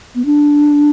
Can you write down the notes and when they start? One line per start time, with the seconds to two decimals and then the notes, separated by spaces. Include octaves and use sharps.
0.15 B3
0.25 D4